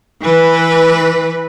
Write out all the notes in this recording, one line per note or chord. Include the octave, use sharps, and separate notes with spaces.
E3 B4